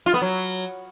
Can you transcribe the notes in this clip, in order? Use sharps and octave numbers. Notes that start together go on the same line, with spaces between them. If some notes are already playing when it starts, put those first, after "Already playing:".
F4
B3
F#3